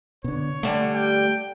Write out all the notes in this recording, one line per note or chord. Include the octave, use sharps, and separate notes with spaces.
B2 D3 C#5
D3 G3 A3
G5